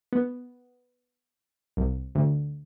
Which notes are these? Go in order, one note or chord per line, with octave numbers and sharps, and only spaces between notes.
B3
C2
D2